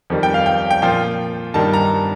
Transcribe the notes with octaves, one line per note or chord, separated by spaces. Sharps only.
F2 D#3 G3
G5
F5
G5
G5
A#2 F3 G5
G2 D#3 G3 A5
A#5